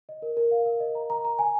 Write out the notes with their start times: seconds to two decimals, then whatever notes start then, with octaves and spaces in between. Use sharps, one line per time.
0.09 D#5
0.22 A#4
0.37 A#4
0.51 F5
0.66 A#4
0.80 D#5
0.95 A#5
1.10 A#5
1.25 A#5
1.39 G#5